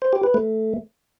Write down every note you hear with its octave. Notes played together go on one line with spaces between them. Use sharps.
C5
G4
B4
A3